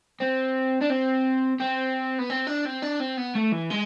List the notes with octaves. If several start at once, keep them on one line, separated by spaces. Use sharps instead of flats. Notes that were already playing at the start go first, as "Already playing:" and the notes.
C4
D4
C4
C4
B3
C4
D4
C4
D4
C4
B3
A3
E3
G#3